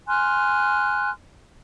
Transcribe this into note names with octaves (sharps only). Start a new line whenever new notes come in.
G#5 C6 F6 F#6